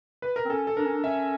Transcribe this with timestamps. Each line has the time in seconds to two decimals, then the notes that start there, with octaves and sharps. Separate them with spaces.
0.22 B4
0.36 A#4
0.45 C4
0.50 C#4 A4
0.67 A4
0.77 D4 A#4
0.85 C#4
0.94 D4
1.04 C#4 E5